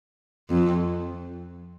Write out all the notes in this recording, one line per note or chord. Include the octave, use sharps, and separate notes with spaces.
F2